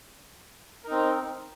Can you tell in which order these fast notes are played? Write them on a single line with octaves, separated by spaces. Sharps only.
A#4 D#4 C4